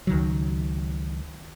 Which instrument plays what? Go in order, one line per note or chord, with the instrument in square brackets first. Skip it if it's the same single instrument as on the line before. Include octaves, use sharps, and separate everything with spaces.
[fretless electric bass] C#2 D#3 F#3